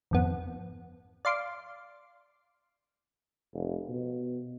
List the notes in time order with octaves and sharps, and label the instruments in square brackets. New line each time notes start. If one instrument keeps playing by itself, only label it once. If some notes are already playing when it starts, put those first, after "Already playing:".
[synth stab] G#1 F2 B3
D5 F5 C6 D6
[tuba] F1
B2